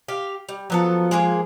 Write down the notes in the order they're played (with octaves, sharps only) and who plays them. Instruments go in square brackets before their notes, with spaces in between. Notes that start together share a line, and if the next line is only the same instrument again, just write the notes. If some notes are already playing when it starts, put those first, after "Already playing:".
[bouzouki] G4 F5
G3
[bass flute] F3 [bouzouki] F#3 B3 A4
[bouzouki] G#3 A#3 G#4